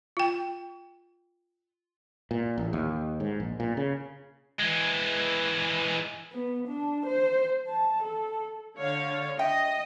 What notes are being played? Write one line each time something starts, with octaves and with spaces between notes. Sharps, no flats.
F4 G5
A#2
A1
D#2
G#2
A#1
A#2
C#3
E3 G#3
B3
D4
C5
A5
A4
D3 C#5 F5
D#5 E5 G5